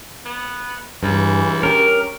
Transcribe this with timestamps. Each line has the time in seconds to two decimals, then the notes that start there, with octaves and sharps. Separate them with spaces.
0.26 B3
1.03 C#2 G2 E3
1.63 C#4 G4 A#4